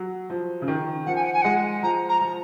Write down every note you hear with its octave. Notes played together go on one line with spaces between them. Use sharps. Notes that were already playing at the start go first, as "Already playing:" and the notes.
Already playing: F#3
F3
C#3
D#3
F3 F#5
G#5
F#5
G#5
G#3 F#5
F3 A#5
A#5
F3